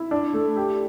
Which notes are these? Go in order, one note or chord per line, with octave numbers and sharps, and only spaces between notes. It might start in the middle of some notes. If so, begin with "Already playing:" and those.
Already playing: E4
D4
A3
G4